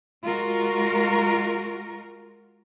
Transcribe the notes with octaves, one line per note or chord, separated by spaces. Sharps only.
G#3 F4 F#4 A#4